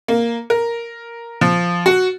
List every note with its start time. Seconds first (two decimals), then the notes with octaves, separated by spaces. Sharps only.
0.08 A#3
0.50 A#4
1.41 F3
1.86 F#4